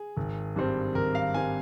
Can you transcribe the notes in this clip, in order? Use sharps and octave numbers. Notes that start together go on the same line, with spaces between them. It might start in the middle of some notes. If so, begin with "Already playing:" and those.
Already playing: G#4
G#1
G2 G3 C4
G#1 A#4
F5
G3 C4 G#5